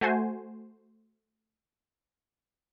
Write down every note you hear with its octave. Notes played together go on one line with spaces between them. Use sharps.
A3 F#4 C5 G#5